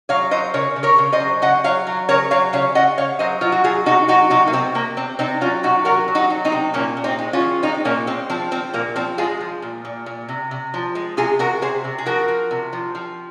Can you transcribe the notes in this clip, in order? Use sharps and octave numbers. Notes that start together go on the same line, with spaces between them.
F#3 C#5 F5
F#3 C5 D#5
C#3 A#4 C#5
C#3
A#4 C#5
C#3
C5 D#5
F#3
C#3 D#5 F#5
F#3 C#5 F5
F#3
C#3 A#4 C#5
F#3 C#5 F5
C#3 C#5 F5
C#3 D#5 F#5
C#3 C#5 F5
F#3 C5 D#5
F#3 F4
F#4
F#3 F4 G#4
C3 D#4 F#4
F#3 D#4 F#4
C3 D#4 F#4
A#3
C3 C4
C3 A#3
C3 C4
C3 C4 D#4
F#3 C#4 F4
C3 D#4 F#4
F#3 F#4 A#4
F#3
D#4 F#4
F#3
C4 D#4
C3
A#2 A#3 C#4
A#2
C4 D#4
G#3
C#4 F4
F3
G#3 C4 D#4
A#2 A#3 C#4
G#3 C4
F3 C4
F3 C4
A#2 A#3
F3 C4
G#3 F4 G#4
F3
A#2
A#2
A#2
C3
C3
F3
G#3
C3 F4 G#4
C3 F#4 A#4
C3 G#4 C5
C3
G#4
F3 F#4 A#4
F3
C3
F3
F3